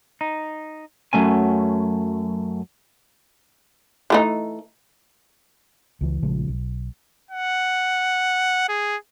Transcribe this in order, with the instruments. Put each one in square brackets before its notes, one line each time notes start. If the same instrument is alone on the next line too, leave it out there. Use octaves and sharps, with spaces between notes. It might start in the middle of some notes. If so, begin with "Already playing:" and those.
[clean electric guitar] D#4
F#2 F#3 A3 C#4 G#5
[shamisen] E3 A3 D#4
[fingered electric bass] C#2 E3
A#1 C#3 F3 G#3
B1
[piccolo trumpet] F#5
G#4